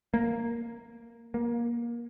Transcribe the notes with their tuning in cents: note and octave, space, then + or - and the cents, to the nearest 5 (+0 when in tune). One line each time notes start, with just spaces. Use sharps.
A#3 -5
A#3 +20